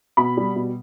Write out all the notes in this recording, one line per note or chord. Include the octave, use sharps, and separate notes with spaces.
B2 B5
G3
B2